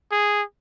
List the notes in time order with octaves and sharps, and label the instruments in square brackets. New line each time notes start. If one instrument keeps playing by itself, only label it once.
[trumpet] G#4